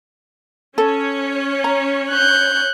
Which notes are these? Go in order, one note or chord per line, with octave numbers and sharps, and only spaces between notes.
C#4 A4 C#5
A#5
F#6 G6